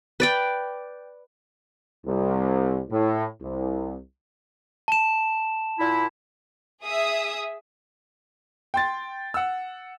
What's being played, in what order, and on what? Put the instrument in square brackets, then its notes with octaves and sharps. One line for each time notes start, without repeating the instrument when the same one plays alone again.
[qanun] B4 D5 G5
[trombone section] C2
A2
C2
[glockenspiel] A5 E7
[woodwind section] A#2 E4
[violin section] G#4 E5 D#6
[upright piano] G5 C6 A6
F#5 E6